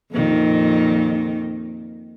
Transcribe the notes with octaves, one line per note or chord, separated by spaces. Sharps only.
F2 A#2 D#3